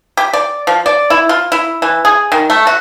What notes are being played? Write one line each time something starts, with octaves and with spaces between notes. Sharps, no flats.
G4
D5
F3
D5
E4
F4
E4
E3
G#4
D#3
A3
F#4